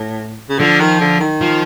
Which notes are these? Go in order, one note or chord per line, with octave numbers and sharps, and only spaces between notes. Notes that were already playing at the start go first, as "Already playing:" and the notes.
Already playing: A2
C#3
D3 F3
D#3
D3
D#3
F3